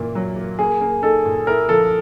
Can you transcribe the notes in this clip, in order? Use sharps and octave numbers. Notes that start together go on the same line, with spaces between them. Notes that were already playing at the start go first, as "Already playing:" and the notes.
Already playing: A#2 E3 A#3
F#3
A#3
A#3 G#4
A#3
D#4 A4
A#2
E4 A#4
F3 A4